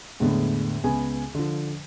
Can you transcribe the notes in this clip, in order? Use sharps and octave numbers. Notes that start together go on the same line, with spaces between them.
E2 A2 D3 G#3 B3
C#2 B3 G#5
D3 F3